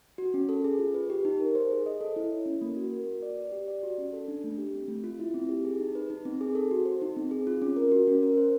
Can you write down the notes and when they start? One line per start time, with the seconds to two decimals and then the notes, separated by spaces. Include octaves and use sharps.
0.18 F#4
0.34 C#4
0.49 A4
0.64 G#4
0.79 F4
0.94 B4
1.10 G4
1.25 D#4
1.40 A#4
1.55 C5
1.71 G#4
1.86 D#5
2.01 A4
2.16 E4
2.31 C#5
2.46 C#4
2.61 A#3
2.76 F#4
2.92 A#4
3.07 F#4
3.22 D5
3.37 B4
3.52 G4
3.68 D5
3.83 F#4
3.98 C#4
4.13 A4
4.28 D4
4.44 A3
4.58 G4
4.74 C4
4.88 A3
5.04 F4
5.20 E4
5.34 C4
5.49 G4
5.65 G#4
5.80 D#4
5.95 B4
6.10 D#4
6.25 C4
6.41 G#4
6.55 A4
6.71 F#4
6.85 C5
7.02 D#4
7.16 C4
7.31 G#4
7.47 F4
7.62 C#4
7.76 A#4
7.92 F#4
8.07 C#4
8.23 A#4
8.38 C5